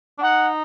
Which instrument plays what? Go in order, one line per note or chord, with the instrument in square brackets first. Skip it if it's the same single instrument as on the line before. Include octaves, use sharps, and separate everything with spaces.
[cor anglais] D4
[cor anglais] D#4 [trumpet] F#5